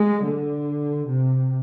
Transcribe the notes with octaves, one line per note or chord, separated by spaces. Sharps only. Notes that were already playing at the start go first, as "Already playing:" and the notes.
Already playing: G#3
D3
C3